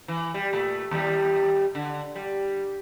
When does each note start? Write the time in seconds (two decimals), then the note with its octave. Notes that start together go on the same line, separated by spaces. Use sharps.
0.08 E3
0.34 G3
0.53 A#2 A3
0.91 D#2 G3
1.75 D3
2.15 G3